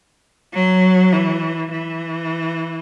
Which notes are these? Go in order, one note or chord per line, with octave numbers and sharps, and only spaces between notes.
F#3
E3
E3